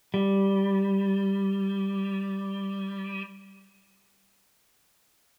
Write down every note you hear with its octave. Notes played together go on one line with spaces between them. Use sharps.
G3